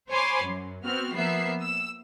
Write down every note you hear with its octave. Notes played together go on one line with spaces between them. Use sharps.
C5 C#5 G#5 B5 C6 D6
F#2
B3 C4 F#4 F6
F3 A#3 B3 E5 C7
E6